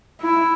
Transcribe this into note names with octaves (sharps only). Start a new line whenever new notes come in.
E4